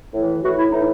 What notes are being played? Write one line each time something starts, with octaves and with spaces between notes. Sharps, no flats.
A2 E3
A2 E3 F#4
E4
A2 E3 D#4